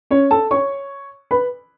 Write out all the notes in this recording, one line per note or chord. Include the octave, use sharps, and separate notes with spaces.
C#4 C#5
A4 A5
C#5 C#6
B4 B5